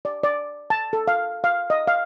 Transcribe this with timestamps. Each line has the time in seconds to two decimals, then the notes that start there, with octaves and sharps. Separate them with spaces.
0.05 D5
0.23 D5
0.70 A5
0.93 A4
1.08 F5
1.44 F5
1.70 D#5
1.87 F5